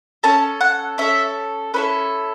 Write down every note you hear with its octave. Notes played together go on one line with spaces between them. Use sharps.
C#4 A4 A5
F#5
C#4 A4 E5
C#4 E4 A4 B4